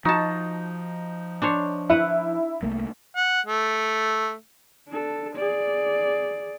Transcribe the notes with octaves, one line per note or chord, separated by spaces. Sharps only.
F3 D#4 F#4 A5
D4 C5 C#5
E4 B4 F#5
C2 A3 A#3
F#5
A3
D4 A4
G#4 D5